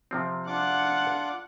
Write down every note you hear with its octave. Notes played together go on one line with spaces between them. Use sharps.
C3 F3 C4
D4 F4 F#5 D6